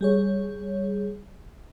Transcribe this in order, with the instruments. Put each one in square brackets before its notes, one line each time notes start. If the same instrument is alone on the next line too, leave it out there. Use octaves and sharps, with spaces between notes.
[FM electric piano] G3 G#4 C#5